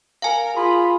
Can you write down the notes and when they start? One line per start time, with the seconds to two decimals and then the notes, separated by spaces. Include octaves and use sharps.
0.22 A#4 F5 G#5
0.57 F4 G#4 B5